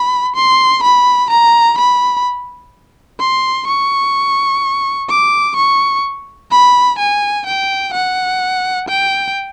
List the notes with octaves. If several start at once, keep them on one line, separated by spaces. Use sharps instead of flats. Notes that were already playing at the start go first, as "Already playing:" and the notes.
Already playing: B5
C6
B5
A#5
B5
C6
C#6
D6
C#6
B5
G#5
G5
F#5
G5